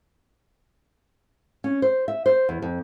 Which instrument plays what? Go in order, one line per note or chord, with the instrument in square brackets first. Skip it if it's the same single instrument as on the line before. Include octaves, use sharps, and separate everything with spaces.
[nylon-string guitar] C#4
C5
E5
C5
E2
F2